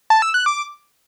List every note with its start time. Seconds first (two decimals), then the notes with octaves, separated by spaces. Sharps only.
0.10 A5
0.22 E6
0.34 F#6
0.46 D6